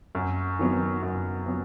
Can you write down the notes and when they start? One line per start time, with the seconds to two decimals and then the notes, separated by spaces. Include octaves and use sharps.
0.15 F#2
0.59 D#3 F#3 B3
1.03 F#2
1.46 F#3 B3